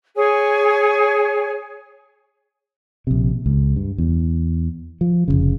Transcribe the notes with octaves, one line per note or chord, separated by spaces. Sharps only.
G#4 C#5 G#5
A#1 C3
C#2
G2
E2
F3
F1 A#1 C#3